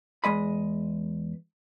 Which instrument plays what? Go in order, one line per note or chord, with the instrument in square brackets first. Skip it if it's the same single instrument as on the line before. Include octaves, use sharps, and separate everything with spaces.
[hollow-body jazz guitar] E2 G#3 D#5 B5